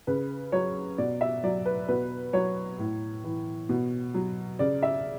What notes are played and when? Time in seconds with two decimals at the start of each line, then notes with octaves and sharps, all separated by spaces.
0.07 C#3 B4
0.52 F#3 C#5
0.98 B2 D5
1.21 E5
1.43 F#3 D5
1.66 B4
1.88 B2 B4
2.33 F#3 C#5
2.79 A2
3.24 E3
3.69 B2
4.14 F#3
4.59 C#3 D5
4.82 E5